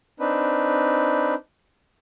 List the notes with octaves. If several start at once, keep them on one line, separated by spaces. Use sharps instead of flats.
C4 D4 D#4 B4